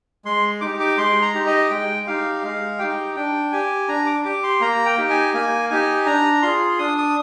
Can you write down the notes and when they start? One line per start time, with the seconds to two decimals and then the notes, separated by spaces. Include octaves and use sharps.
0.25 G#3 C6
0.61 D#4 G4 D6
0.80 D6
0.97 G#3 C6
1.22 A#5
1.35 D#4 G4
1.46 D#5
1.70 G#3 G5
2.07 D#4 G4 F5
2.43 G#3 F5
2.79 D#4 G4 G5
3.16 D4 G5
3.52 G4 G#5
3.88 D4 A#5
4.06 D6
4.24 G4 D6
4.43 C6
4.61 A#3 A#5
4.86 G5
4.98 D#4 G4
5.10 G#5
5.34 A#3 G#5
5.70 D#4 G4 G#5
6.06 D4 A#5
6.42 F4 G#4 C6
6.79 D4 D#6
6.98 D#6